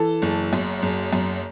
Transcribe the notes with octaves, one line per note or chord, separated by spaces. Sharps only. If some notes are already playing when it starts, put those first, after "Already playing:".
Already playing: E3 A4
F#1
F#2
F#1
F#2